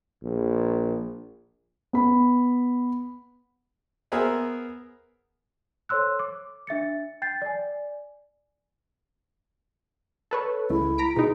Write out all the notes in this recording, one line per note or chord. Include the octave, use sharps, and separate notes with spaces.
A#1
B3 B5
B3 G#4 A#4 C5 E5 G#5
A4 C5 C#5 C6 E6 F#6
D6
D4 E5 A6 C#7
G5 G6 A6 C7
D5 G#5
A4 B4 C#5
C#2 A3 E4
A#5 B6 D7
B2 D#4 G#4